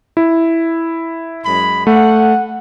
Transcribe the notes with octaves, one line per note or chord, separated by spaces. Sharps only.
E4
F#2 G#3 B5
A3 F#5